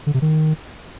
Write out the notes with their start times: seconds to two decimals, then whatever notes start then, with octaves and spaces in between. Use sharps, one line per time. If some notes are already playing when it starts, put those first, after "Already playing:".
0.07 D3
0.14 C3
0.22 D#3